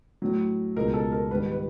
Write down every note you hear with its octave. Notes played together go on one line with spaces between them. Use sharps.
A2 F#3
C#2 B2 G#3 A#4
A4
A#4
G#2 D#3 G3 B4
B4